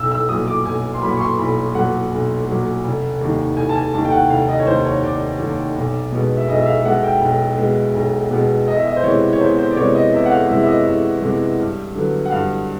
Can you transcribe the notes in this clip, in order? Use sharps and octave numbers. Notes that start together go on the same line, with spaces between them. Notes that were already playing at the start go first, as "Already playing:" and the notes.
Already playing: B1 E6
E6
A#2 F#3 D#6
D6
B1 G#5
C6
A#2 F#3 B5
C#6
C6
B1 B5
A#2 F#3 F#5
B1
A#2 F#3
F1
D#2 D#3
F1 G#5
A5
G#5
D#2 D#3 A5
G5
F#5
F1 F5
D#5
C#5
D#2 D#3 C5
C#5
F1 D5
D#2 D#3
B1
B2 G#3 B3
E5
B1 D#5
E5
F5
B2 G#3 B3 F#5
G5
B1
B2 G#3 B3
B1
B2 G#3 B3
E2 D#5
E5
D#5
C5
C3 E3 G#3 B3 C#5
C#5
E2 C5
C5
D5
C3 E3 G#3 B3 C#5
D#5
E2 E5
F#5
F5
C3 E3 G#3 B3 E5
E5
D#5
E2 E5
C3 E3 G#3 B3
G2
D3 F#3 B3
F#5
G2 F5